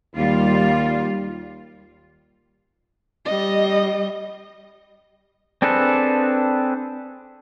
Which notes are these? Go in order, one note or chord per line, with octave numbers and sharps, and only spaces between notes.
D#2 G3 F4
G3 D#5
C4 D4 G#4 A4 B4